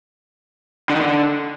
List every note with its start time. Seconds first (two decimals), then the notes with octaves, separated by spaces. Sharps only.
0.90 D3
0.95 D#3
1.01 D3